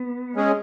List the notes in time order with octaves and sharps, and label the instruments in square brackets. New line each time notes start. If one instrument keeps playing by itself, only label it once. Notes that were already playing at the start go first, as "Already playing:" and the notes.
Already playing: [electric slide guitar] B3
[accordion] G#3 C#4 G#4